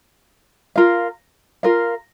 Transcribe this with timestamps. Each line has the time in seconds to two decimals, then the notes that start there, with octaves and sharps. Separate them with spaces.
0.76 F4 A#4 F5
1.63 F4 A#4 F5